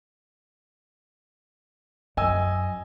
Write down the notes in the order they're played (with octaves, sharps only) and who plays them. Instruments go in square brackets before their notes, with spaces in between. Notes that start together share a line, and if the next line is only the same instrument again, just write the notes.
[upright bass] F#2 [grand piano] D#5 G#5 E6